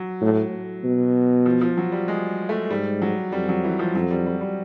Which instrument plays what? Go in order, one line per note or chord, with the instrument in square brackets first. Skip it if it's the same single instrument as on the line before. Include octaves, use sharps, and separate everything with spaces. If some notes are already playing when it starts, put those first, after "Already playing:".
Already playing: [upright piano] F#3
[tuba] A2
B2
[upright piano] F3
F3
F#3
G3
G#3
A3
[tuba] G#2 [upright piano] G3
[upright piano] F#3
[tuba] F2 [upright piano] G3
[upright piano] F#3
E3
F3
[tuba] F2 [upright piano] F#3
[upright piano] G3
G3
G3